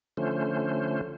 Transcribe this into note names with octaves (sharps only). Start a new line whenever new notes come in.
D3 F3 A3 C#4 C5